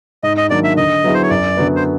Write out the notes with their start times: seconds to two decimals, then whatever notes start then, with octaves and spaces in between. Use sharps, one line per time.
0.23 G#2 D#5
0.37 D#5
0.50 D#3 F#3 A#3 D4 D5
0.64 E5
0.77 D3 D#5
1.04 F#3 B3 E4 G#4
1.14 C5
1.23 C#5
1.30 F#2 D5
1.57 D3 F#3 B3
1.76 C5